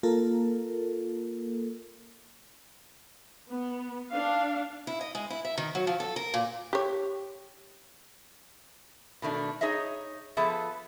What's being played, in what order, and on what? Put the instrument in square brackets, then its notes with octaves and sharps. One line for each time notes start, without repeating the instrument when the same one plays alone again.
[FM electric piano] A#3 F4 A4 A#4
[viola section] B3
D4 F5
[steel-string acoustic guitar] E4
D#5
G#3
E4
E5
D#3
F#3
F3
A4
A#4
A#2
[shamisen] G4 C#5
[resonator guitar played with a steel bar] B2 D#3 A3 D4
D#4 G#4 C#5 D#5 E5
F3 B3 G#4 A4 E5